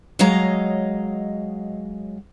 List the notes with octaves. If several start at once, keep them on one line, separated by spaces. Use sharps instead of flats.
F#3 G#3 C#5 D#5 F5 A#5